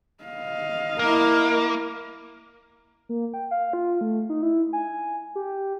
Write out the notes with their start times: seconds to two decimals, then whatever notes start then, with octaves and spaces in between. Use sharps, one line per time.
0.24 D#5 F5
0.99 A#3 E4 A#4
3.09 A#3
3.34 G5
3.51 F5
3.73 F4
4.01 A3
4.29 D#4
4.42 E4
4.73 G#5
5.36 G4